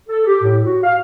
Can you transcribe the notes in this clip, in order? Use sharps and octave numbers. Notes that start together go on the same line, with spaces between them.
A4
G4
A2
F#4
F5